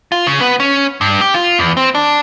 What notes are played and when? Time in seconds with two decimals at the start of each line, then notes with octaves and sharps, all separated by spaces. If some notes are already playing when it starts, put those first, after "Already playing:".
0.12 F4
0.27 C#3
0.41 B3
0.60 C#4
1.01 G2
1.21 G4
1.34 F4
1.59 E2
1.77 C4
1.95 D4